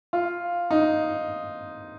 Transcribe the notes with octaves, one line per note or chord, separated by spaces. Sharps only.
F4
D#4